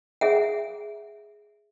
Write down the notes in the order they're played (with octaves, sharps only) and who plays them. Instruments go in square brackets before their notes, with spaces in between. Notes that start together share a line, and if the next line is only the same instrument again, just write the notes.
[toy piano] G#4 E5 F#5